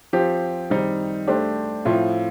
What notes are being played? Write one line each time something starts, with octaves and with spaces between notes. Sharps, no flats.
F3 C4 G4
D#3 G3 C4 D#4
A3 D4 G4 C5
A2 F3 C4 F4 C5